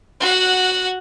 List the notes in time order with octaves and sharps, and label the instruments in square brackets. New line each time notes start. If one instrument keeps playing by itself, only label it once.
[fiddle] F#4 F#5